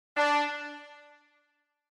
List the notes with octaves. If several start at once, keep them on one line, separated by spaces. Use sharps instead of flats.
D4